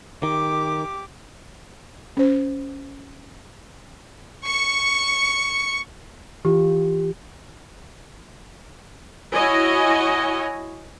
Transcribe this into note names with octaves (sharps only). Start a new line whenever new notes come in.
D#3 G4 D6
C#4 C5
C#6 C#7
E3 F4 G4
E4 F#4 C#5 D#5 G#5